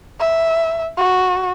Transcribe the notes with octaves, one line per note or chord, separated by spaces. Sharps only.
E5
F#4